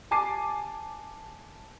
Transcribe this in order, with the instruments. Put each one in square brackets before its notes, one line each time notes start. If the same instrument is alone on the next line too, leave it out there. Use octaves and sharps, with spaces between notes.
[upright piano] G#5 A5 D6 C7 D#7